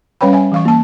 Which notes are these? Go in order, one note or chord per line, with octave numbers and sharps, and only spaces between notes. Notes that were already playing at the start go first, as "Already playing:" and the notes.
G3 C#4 B4 C#5 G5 B5
E5 G#5
E3 F5 C#6
A#3 A5